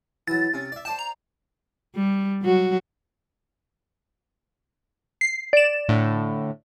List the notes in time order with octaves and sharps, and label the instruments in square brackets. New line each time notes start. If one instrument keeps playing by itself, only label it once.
[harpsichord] E3 F#3 [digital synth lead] A6
[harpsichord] C3 C#4
D5 E5
[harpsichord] C5 D5 G5 [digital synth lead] A5
[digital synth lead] A#5
[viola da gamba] G3
F#3 F#4
[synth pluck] C7
D5 E7
[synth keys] A2 D3